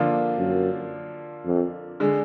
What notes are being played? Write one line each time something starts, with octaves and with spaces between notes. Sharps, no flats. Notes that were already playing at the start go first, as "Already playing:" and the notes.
Already playing: D3 F3 A#3 D4 F4
F#2
F2
D3 G#3